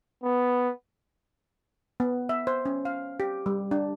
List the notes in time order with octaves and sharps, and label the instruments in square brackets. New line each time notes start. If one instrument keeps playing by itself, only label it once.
[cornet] B3
[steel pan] B3
E5
C5
C#4
F5
G4
G3
D4